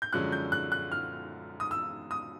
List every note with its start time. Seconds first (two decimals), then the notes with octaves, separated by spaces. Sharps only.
0.02 G6
0.13 F#2 D3 F3 G#3 C#4 F#6
0.32 G6
0.52 F#6
0.72 F#6
0.92 F6
1.60 D#6
1.71 E6
2.11 D#6